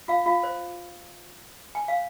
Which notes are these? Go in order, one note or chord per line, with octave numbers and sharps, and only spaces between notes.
F4 F5
F4 F5
C5
G#5
F5